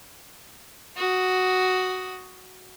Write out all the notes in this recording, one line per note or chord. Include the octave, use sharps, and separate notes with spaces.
F#4 D#6